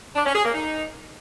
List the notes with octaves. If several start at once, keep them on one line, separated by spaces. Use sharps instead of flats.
D4
C#4
G#4
A#3
D#4